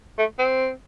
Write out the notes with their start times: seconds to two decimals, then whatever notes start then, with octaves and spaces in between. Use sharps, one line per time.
0.18 A3
0.39 C4